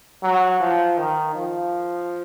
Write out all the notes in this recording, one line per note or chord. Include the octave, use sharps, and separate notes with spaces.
F#3
F3
D#3
F3